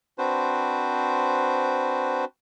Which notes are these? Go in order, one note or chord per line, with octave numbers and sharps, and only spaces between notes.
C4 D4 F#4 B4 C5